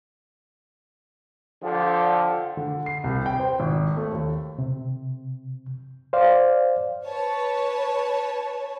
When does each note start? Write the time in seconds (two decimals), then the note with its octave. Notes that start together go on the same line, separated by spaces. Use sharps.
1.63 D3 F3 G4 A4
2.57 D3
2.86 C7
3.04 C2
3.26 G5
3.40 C5
3.60 G#1
3.97 A3
4.11 D#2
4.59 C3
6.13 C5 D5 F5
7.05 B4 C#5 A5